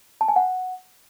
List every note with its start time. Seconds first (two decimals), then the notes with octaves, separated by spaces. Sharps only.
0.21 A5
0.28 G#5
0.36 F#5